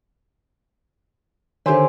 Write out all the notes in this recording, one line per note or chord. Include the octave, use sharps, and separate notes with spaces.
D3 D#3 G4 C5 C#5 E5 G#5 C6